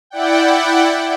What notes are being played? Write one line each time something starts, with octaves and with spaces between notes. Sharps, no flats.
E4 D5 F#5 G5